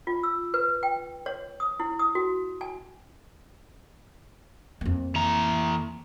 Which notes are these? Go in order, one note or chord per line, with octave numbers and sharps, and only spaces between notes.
F4
E6
B4
G5
C#5
D#6
E4
D#6
F#4
G#5
F2 A#3
E3 A#5